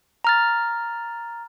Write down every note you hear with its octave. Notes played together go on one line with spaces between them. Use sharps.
A#5 F6 A6